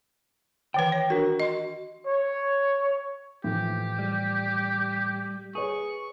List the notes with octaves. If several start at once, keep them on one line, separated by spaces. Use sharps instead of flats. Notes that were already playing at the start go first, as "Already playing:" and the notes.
D#3 E3 B4 G5
C#5
D4 F#4 A#4
D#5 C6
C#5
A2 E3 F3 G4
G3
G#4 B4 C#5 C#6